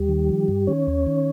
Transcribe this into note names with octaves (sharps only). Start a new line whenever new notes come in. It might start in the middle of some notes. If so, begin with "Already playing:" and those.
Already playing: D#2 G3 G4
D#3
F3
G2
D#3 C#4 C#5
D#2
D#3